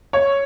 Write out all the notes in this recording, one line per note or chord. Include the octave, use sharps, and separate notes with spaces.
C#5